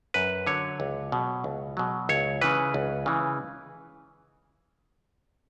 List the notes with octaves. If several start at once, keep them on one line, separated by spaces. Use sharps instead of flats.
F#2 B4
D3 F#3 C#5
C#2
B2 F#3
C#2
B2 F#3
C#2 C#5
C#3 E3 B4
C#2
C#3 E3